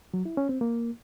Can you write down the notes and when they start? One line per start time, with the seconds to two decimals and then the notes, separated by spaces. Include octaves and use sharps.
0.14 F#3
0.25 E4
0.37 C#4
0.49 C4
0.61 A#3